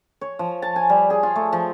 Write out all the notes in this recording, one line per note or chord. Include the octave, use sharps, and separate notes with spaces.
C#5
F3
A5
G#5
G3
G#4
F4
A3
F3